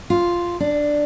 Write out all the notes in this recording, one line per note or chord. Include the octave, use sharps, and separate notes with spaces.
F4
D4